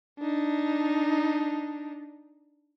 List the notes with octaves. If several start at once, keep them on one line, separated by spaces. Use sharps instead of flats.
D4 D#4